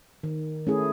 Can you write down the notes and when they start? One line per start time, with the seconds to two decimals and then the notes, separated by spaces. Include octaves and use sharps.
0.23 D#3
0.67 A3 C#4 E4 G#4